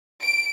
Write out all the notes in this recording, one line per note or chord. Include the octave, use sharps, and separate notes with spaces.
D7